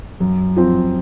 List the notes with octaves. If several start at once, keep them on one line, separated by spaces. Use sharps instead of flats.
F#2
F3 C4